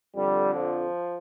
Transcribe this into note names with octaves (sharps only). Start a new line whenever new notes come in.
F2 D3 G3
F3